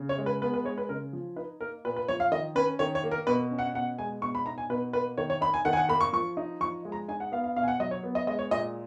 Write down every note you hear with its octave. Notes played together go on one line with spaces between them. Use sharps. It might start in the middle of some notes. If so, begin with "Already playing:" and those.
Already playing: C#3
C#5
G#3
B4
B3 B4
B4
G#3 C#5
B4
C#3 A#4
F3
D#4 B4
A#3 A#4
A#2 B4
B4
F3 C#5
F5
D#3 D#5
C#4 B4
D#3 C#5
C#5
A#3
A#4
B2 B4
C#4
F#5
B2 F#5
G#3 G#5
B2 C#6
B5
D#4 A#5
G#5
B2 B4
A#3 B4
D#3 C#5
C#5
D#4 B5
G#5
D#3 F#5
G#5
F#5
A#3 B5
C#6
F3 C#6
D#4
F3 C#6
G#3
A#5
D#4 G#5
F#5
B3 F5
F5
B2 F5
G#5
F#5
F#3 D#5
C#5
B3
D#5
G#3 D#5
C#5
A#2 D#5